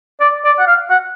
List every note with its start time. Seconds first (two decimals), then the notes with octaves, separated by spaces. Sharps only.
0.21 D5
0.45 D5
0.59 F#5
0.67 F5
0.90 F#5